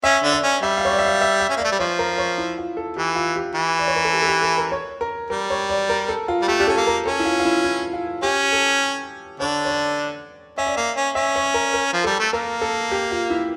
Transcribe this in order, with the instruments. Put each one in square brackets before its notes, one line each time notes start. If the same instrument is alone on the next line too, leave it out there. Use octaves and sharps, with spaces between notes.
[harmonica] C#4 [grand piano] E5
[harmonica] D3 D4
[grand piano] D5
[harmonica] C#4
[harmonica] G3 [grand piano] E5
[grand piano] F5
C#5
D5
E5
F5
E5
E5
[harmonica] C#4
A#3
[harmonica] A3 [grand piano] D5
[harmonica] G3
[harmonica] F3 [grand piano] C#5
[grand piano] A#4
C#5
E4
F4
A4
[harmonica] E3 [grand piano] G4
[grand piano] F4
G4
[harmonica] E3
[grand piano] D5
C#5
A#4
A4
G4
A4
G4
A4
A#4
C#5
A#4
[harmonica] G3 [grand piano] A#4
[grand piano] C#5
D5
A#4
A4
F4
[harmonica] G3
[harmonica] A3 [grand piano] G4
[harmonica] D4 [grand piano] G4
[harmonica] C#4 [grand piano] A4
[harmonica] A#3
[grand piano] A#4
[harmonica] C#4 [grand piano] A4
[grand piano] E4
F4
F4
E4
E4
F4
[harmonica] C#4 [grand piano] G4
[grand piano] A4
[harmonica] D3 D4 [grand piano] C#5
[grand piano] C#5
D5
[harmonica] C#4 [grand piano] E5
[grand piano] D5
[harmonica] A#3 [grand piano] E5
[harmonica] C#4
[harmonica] C#4 [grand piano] E5
[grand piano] C#5
A#4
A#4
[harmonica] F3
[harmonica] G3 [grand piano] A4
[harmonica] A3
[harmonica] A#3 [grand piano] A#4
[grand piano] A4
G4
F4
E4